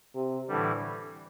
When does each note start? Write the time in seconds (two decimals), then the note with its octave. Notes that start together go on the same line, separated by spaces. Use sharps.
0.15 C3
0.48 A2 D3 E3 G3